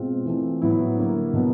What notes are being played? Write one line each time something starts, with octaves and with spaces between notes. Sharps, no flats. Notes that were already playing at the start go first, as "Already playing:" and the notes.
Already playing: B2 G#3 C4 F4
E3 A3 C4
A2 F#3 B3 E4
D3 G3 A#3
B2 F#3 B3